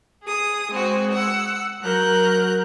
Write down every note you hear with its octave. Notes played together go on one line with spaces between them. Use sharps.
G#4 D#6
G#3 C4 F#4
F#5 E6
F#3 A#4 F#6 G6